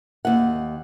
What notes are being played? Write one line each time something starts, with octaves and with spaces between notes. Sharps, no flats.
D#2 F#5